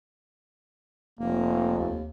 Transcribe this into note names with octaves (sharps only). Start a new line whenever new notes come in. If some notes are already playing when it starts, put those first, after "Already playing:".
F1 A#3
D#2